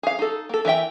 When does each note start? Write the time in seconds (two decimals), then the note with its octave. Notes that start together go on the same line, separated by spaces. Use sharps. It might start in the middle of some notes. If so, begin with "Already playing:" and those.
0.03 G#4 F5
0.19 D#4 A4
0.49 A#3 A4
0.65 E3 A#4 E5 G5